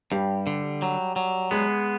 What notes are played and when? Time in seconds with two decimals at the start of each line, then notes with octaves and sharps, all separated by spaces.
0.12 G2 G3 G4
0.47 D3
0.82 F#3
1.16 F#3
1.51 G#3 B3 G#4